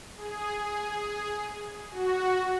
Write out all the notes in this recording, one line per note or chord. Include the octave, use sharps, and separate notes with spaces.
G#4
F#4